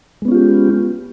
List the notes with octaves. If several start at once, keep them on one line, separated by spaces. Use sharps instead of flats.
G#3 B3 C#4 F4 G4